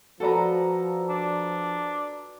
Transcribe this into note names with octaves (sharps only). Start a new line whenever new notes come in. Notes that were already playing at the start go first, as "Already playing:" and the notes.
F3 F#4 A4 B4 D5 A#5
D4